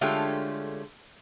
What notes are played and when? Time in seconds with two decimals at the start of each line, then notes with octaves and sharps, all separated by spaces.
0.01 D3 G#3 A3 C#4 F4 G4